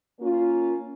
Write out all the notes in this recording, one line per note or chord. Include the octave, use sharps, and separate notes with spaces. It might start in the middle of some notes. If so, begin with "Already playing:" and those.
A#3 C#4 F4